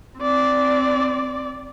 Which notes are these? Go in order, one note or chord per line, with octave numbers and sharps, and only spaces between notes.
C4 D5